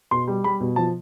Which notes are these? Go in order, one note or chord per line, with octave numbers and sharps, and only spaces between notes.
B2 C6
G3
G3 B5
B2
F3 A5